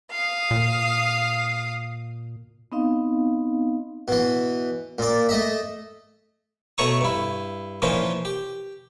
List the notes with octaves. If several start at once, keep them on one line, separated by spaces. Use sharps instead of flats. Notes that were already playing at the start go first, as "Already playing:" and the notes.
F5 D#6
A#2
B3 C4 D#4 D#5 F5
B2 E3
A#2 D5
A3 D#5 E5
B2 A3 C#5 A#5 C#6 D#6
G2 E4
A#2 E3 F3 C#4 D#4
G4